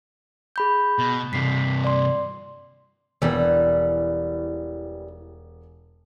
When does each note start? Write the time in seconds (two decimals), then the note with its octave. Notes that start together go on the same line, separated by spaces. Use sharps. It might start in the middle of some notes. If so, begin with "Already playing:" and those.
0.56 G#4 B5 G6
0.99 B2
1.33 G2 C3 B6 C7
1.84 D5 C6
3.22 E1 E3 G3